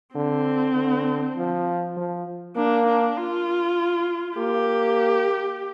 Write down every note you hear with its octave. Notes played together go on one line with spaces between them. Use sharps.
D3 C4
D3
F3
F3
A#3 D4
D4
F4
A#3 G4